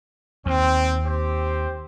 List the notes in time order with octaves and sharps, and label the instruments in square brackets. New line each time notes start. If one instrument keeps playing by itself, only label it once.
[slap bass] D#2 [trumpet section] C4
[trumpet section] C4 G4 C5